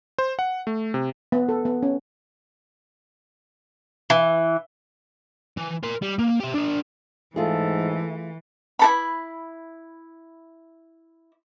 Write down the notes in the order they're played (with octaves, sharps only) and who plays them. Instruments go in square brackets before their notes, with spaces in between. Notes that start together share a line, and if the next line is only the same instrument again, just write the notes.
[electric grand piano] C5
F#5
A3
C3
[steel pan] B3
A4
B3
C#4
[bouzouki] E3
[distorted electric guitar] E3
A#4 C6
G3
A#3
G4 E5
D4 A#4
[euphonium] G#2 [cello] E3 [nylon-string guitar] A3 F4 G#4 [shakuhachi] A4
[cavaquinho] E4 A4 B5